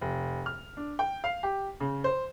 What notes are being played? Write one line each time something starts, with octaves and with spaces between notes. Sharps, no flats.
F1
F6
D4
G5
F5
G4
C#3
C5